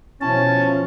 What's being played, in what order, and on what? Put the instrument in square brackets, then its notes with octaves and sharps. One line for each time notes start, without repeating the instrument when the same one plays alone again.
[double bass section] B2 F3 [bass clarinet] C#4 [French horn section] E4 C#5 [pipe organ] A5